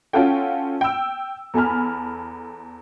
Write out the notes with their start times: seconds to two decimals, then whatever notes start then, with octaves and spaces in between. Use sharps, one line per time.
0.13 C#4 F4 F#4 A4 G5
0.81 G5 E6
1.54 E2 A4 G#5 B5 F6